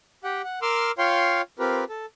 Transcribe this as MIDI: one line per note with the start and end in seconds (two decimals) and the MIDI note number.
0.24 0.42 67
0.24 0.42 78
0.24 0.42 79
0.44 0.60 78
0.62 0.91 70
0.62 0.91 84
0.62 0.91 86
0.62 0.91 88
0.62 0.91 89
0.98 1.42 65
0.98 1.42 73
0.98 1.42 77
0.98 1.42 79
0.98 1.42 84
1.59 1.84 60
1.59 1.84 65
1.59 1.84 67
1.59 1.84 70
1.59 1.84 71
1.89 2.06 69